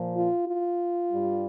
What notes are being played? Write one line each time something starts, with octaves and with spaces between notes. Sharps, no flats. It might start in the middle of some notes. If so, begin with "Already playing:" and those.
Already playing: A#2 F3
F4
F4
G2 G3